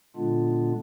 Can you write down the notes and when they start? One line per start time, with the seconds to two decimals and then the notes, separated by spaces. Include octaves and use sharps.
0.16 A#2 D3 G#3 B3 D4 F4